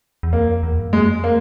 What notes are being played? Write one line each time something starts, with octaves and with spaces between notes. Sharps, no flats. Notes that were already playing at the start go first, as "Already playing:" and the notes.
E2
F2 A#3
E2
G2
F#2
F2 G#3
A#3